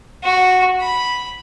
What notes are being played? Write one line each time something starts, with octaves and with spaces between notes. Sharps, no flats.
F#4
B5